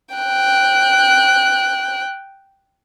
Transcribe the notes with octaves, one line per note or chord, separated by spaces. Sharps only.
G5 F#6